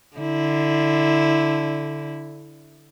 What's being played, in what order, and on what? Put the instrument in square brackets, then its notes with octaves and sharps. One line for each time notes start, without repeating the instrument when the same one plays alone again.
[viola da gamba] D3 E4